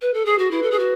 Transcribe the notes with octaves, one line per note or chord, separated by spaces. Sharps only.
B4
A4
G#4
F#4
E4 B4
A4
G#4
F#4